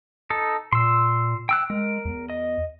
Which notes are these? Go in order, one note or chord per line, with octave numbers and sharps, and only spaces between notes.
D#4 A4
A#2 C6 E6
G5 E6 F#6
G#3 A#4
E2
D#5